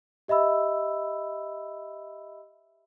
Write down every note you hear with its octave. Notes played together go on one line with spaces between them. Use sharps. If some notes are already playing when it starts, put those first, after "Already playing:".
G4 D#5 E5 B5 E6